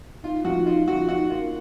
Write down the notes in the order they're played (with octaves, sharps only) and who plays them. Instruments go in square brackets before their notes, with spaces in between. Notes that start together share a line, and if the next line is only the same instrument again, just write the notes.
[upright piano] D#4 [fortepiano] F4
[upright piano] F3 [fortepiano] F#4
[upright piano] D#4 [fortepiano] F4
[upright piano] F3 [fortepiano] F#4
[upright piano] D#4 [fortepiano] F#4
[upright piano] A#3 [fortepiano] F4